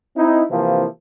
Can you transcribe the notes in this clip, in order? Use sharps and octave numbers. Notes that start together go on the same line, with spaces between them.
C4 D#4 E4
C3 E3 F3 A#3 C4 E4